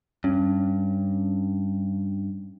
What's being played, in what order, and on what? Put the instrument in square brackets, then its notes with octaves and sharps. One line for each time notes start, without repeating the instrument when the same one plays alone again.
[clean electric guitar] G2 [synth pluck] C#4